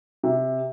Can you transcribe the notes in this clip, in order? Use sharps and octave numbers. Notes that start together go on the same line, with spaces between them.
C3